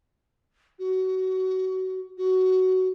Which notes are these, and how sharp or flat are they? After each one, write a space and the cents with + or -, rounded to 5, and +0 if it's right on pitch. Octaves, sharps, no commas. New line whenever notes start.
F#4 +25
F#4 +15